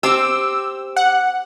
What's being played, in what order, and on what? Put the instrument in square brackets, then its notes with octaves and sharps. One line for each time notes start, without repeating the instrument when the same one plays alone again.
[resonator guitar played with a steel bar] C4 G4 [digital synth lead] E6
[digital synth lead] F#5